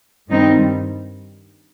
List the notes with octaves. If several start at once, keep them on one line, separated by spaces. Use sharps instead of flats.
G2 D#3 G3 C4 D#4